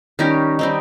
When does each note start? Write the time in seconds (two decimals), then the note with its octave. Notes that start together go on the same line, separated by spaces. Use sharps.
0.19 D#3 G3 C#4 D#4 G4
0.59 G3 C4 D#4